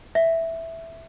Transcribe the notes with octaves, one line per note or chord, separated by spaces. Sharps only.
E5